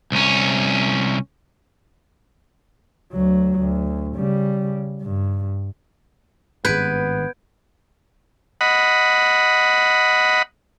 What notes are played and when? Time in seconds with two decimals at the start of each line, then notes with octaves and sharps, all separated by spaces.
0.12 C2 C#4
3.13 D2 F#3
3.59 D2
4.16 C#3 G3
5.02 G2
6.65 G#1 G2 B3 B4 G6 G#6 D7
8.61 D#5 F#5 B5